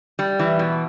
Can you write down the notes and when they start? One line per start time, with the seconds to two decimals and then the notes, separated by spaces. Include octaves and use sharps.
0.19 G3
0.39 E3
0.59 B2